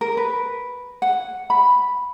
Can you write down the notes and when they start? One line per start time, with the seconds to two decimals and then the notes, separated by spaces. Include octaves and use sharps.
0.01 A#4
0.17 B4
1.02 F#5
1.50 B5